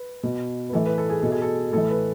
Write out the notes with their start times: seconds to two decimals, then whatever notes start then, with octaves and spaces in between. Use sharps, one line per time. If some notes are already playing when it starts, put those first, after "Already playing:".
Already playing: B4
0.23 B2
0.69 B4
0.72 A2 E3 A4
0.86 B4
0.98 A4
1.10 G#4
1.22 B2 A4
1.32 G#4
1.42 A4
1.72 A2 E3 A4
1.90 B4